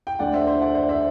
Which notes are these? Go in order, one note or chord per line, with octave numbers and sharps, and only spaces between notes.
G5
D2 D3 D5 F#5
C5 E5
C5 E5
D5 F#5
C5 E5
C5 E5